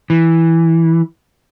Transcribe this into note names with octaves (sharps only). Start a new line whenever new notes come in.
E3